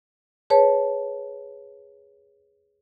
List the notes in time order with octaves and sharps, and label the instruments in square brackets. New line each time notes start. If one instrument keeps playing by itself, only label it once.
[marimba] G#4 B4 C#5 A5